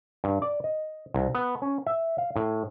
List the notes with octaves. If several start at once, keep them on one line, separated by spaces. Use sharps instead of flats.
G2
D5
D#5
C2
B3
C#4
E5
F5
A2